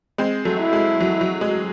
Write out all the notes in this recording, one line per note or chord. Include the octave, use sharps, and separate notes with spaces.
G#3 C4
F#3 A3
E4
G#3
F#3
F#3
G#3